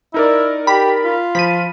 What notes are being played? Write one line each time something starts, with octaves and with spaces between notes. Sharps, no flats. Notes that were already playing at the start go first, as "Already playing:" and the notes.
D#4 E4 A#4 D5
G4 B5
F4
F3 B5 D#7